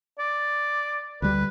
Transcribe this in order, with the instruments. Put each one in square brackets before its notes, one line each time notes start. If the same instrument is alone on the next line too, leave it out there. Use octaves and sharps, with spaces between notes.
[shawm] D5
[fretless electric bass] D2 G3 [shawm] B4